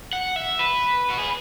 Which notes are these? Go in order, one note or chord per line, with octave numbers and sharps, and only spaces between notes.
F#5
E5
B4
F#4
G#4